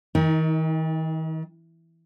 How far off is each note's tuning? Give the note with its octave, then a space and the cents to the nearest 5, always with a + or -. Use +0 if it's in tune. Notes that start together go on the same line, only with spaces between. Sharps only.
D#3 +45 D#4 +20 A#4 +10